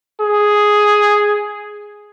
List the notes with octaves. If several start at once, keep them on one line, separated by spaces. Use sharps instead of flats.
G#4